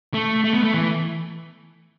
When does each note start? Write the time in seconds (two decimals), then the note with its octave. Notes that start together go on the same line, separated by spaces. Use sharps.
0.14 A3
0.44 A3
0.54 B3
0.64 A3
0.74 E3